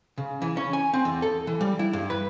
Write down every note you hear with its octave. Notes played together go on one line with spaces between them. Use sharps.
C#3
E3
C#4
G#5
C4
E2
A4
E3
G3
E4
G2
B4